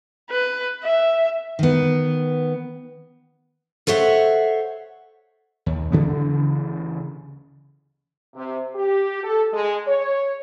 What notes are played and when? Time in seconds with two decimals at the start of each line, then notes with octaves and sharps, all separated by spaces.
0.31 B4
0.83 E5
1.59 D#3 B3
3.87 A4 C5 C#5 E5 F#5
5.66 D#2
5.92 D2 C#3 E3 B3
8.35 C3
8.75 G4
9.23 A4
9.53 G#3
9.87 C#5